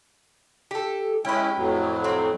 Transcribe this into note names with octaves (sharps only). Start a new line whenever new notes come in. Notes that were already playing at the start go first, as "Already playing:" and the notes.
G4 A4
G#3 C#4 E4 G4 B4
F2 A2 F#3
C4